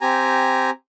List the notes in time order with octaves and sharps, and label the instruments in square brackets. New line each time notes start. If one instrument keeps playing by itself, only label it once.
[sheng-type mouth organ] C4 G4 G#5 A#5